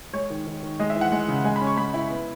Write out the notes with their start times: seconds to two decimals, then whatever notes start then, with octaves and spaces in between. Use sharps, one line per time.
0.13 G#3 C#5
0.30 D#3
0.47 D#3
0.63 D#3
0.80 G#3 D#5
0.90 E5
0.96 E3
1.01 F#5
1.12 G#3
1.28 C#3
1.44 G#3 G#5
1.56 B5
1.61 C#4
1.67 C#6
1.77 G#3 B5
1.94 E4
2.10 B3